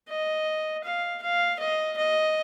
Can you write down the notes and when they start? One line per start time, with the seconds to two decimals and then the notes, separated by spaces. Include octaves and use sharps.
0.09 D#5
0.84 F5
1.22 F5
1.59 D#5
1.97 D#5